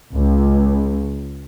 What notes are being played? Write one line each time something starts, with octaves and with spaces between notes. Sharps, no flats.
C#2